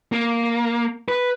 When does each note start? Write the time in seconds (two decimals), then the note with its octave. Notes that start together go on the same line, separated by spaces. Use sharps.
0.12 A#3
1.08 B4